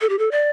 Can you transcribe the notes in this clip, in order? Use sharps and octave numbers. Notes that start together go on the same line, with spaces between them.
A4
G4
A4
D5